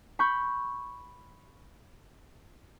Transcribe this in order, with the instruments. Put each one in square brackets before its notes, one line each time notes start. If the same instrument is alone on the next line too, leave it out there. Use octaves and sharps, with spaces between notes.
[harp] B5 C#6 G6